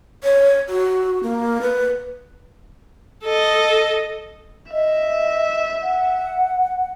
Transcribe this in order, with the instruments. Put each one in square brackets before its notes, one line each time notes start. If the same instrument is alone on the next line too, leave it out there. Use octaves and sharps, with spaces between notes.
[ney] C#5
F#4
A#3
B4
[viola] A4 D#5
[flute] D#5 [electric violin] E5
[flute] F#5